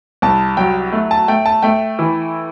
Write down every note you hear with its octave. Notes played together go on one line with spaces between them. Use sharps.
C2 A5
F#3 G5
A3
A5
A3 G5
A5
A3 G5
E3